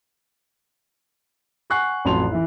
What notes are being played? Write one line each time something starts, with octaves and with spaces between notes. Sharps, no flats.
F#5 G#5 C#6 F#6 C7
A1 F2 F#3 A5 C6 F7
E3 E4